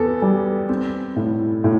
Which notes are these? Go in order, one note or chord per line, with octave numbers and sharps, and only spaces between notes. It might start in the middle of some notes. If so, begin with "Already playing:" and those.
Already playing: E2 B3 A4
G3
C4
A2
A2